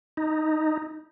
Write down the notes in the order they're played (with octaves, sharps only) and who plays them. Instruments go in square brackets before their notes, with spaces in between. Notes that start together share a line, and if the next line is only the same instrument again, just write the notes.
[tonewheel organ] D#4